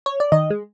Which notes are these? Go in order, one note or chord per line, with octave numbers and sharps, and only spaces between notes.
C#5
D5
D#3 D#5
G#3